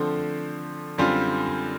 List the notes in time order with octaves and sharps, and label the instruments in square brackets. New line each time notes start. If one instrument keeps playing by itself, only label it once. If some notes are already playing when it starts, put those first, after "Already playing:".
Already playing: [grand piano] D3 F3 A3 C4
F#2 D3 G3 C4 F4